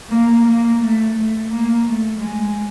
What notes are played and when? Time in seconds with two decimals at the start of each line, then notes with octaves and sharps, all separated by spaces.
0.10 A#3
0.46 A#3
0.80 A3
1.15 A3
1.50 A#3
1.85 A3
2.19 G#3